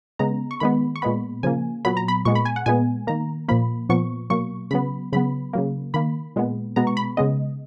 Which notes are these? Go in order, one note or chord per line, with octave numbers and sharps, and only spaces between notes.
C#3 G#3 B3 A#5
C#6
D#3 G#3 B3 B5
C#6
A#2 G#3 B3 B5
C#3 F3 A#3 G#5
A#2 F#3 B3 B5
A#5
B5
A#2 G#3 B3 C#6
B5
G#5
F#5
A#2 G#3 B3 G#5
D#3 A#3 A#5
A#2 F3 A#3 B5
A#2 F3 B3 C#6
B2 F#3 A#3 C#6
C#3 F#3 B3 B5
C#3 F#3 B3 B5
C#3 F#3 A#3
D#3 A#3 B5
A#2 G#3 B3
B2 G#3 B3 A#5
C#6
B5
C#3 G#3 B3 D#5